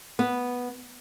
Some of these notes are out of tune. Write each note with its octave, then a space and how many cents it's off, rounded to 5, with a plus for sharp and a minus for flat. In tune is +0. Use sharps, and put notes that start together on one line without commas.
B3 -5